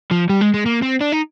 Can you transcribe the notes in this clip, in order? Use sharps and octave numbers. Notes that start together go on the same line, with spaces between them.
F3
G3
G#3
G#3
A#3
C4
D4
D#4